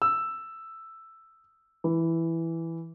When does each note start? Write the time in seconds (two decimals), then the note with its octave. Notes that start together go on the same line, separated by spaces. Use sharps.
0.02 E6
1.84 E3